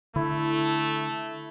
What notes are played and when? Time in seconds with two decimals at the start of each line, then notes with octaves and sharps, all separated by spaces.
0.16 D3 A3 E4